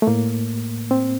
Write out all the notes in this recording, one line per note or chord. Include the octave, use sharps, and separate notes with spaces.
A3
A2 A#3
C4